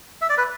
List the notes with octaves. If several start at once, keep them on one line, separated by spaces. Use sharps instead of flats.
E5
D5
B4